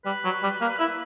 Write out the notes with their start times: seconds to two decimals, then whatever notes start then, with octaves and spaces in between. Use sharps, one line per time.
0.05 G3 B4
0.24 F#3
0.43 G3
0.61 A#3
0.80 E4